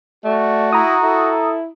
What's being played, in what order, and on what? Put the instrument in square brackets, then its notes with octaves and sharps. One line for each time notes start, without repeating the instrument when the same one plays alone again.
[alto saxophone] A3 [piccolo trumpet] F#4 [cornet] D5
[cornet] E4 [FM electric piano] A#5 D#6
[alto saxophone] E4 [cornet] A4